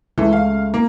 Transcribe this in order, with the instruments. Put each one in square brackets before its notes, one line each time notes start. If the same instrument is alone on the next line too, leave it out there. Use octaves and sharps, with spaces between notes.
[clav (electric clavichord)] C#2 A3 [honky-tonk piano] E3
[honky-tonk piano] F5
A#3